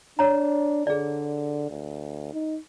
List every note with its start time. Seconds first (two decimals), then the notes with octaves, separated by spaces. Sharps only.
0.19 D4 C#5 A#5
0.87 D3 G#4 D5
1.70 D2
2.33 D#4